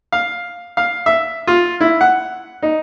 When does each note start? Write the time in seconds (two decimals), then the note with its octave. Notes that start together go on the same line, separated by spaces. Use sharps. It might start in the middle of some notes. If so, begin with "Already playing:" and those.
0.12 F5
0.77 F5
1.06 E5
1.47 F4
1.81 E4
2.01 F#5
2.62 D#4